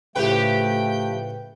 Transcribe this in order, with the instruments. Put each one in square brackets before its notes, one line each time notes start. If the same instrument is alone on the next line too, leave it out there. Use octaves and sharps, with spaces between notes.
[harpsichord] A2 C#3 [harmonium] F3 A3 [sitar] G4 B4 [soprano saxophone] G5